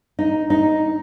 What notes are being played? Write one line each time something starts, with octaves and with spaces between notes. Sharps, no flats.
D#4
D#4